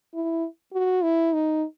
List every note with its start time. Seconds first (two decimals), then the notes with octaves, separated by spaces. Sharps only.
0.14 E4
0.73 F#4
1.03 E4
1.33 D#4